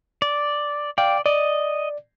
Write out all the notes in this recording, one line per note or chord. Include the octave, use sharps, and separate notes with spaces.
D5
D5 F5 G5
D5 D#5